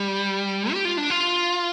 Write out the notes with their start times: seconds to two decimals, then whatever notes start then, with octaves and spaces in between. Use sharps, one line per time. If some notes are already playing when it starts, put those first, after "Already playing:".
Already playing: G3
0.73 G4
0.85 F4
0.97 D4
1.10 F4